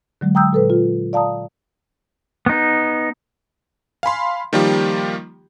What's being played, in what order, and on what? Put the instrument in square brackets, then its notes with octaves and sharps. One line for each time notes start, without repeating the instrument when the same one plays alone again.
[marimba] D3 F#3 G#3
G5 A#5 D#6 E6 G6
A#2 A4 B4
F4
D5 F5 A5 A#5 D#6
[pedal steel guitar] B3 D#4
[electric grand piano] F5 G#5 B5 C6
D#3 F3 G3 A#3 F4 G4